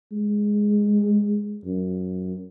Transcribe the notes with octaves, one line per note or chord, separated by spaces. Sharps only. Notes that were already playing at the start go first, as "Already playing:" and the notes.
G#3
F#2